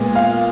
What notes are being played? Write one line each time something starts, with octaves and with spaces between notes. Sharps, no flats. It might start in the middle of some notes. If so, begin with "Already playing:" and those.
Already playing: A#2 G#3 B3
F5